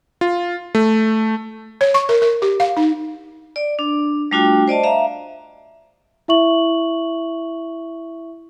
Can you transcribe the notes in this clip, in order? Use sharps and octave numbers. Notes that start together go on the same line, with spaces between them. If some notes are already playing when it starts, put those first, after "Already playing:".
F4
A3
C#5
C#6
A#4
A#4
G4
F5
D#4
D5
D4
G3 A3 D4 F4 F#4 G5
C5 D5 D#5 A5
E5 F5 A#5
E4 E5 C#6 F#7